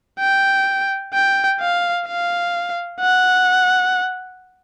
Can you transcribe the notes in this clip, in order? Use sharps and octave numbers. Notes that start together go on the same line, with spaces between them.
G5
G5
F5
F5
F#5